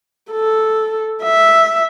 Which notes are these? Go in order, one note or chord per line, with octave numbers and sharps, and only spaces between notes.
A4
E5